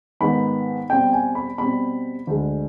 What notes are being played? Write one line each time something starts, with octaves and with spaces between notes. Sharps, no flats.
G#2 D#3 B3 B5
B2 G3 C4 G5
G#5
B5
B2 G3 C4 B5
D2 D3 G#3